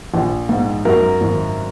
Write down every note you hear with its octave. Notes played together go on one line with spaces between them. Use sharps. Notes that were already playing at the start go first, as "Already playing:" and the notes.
A#1
G#2
F#2 A#4
G#1